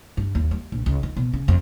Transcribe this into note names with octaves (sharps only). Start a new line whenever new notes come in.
G2
D#2
G3
A#1
C#2
D#3
B2
C#3
F2